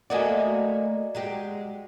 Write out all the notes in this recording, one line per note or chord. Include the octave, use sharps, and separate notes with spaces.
A3 A#3 F#4 D5 D#5 G#5
F#3 G#3 G4